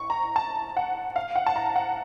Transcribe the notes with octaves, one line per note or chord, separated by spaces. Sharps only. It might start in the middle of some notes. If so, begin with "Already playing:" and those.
Already playing: C#6
A#5
A5
F#5
F5
F#5
A5
A#5
F#5